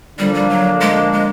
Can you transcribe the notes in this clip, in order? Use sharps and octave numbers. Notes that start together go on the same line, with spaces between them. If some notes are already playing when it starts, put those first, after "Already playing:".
D3 F3 G3 A#3 D4
G3
F#3
G#3
G#3